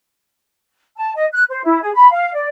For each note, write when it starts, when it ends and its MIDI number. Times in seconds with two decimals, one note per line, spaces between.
0.97 1.12 81
1.16 1.26 75
1.33 1.43 90
1.49 1.61 72
1.64 1.82 64
1.82 1.91 68
1.94 2.10 83
2.11 2.33 77
2.34 2.48 74